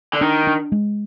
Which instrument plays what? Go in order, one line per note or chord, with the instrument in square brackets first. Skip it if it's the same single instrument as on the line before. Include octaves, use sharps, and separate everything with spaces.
[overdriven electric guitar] D3
[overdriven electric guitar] D#3 [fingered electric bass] D4
[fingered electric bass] D4
G#3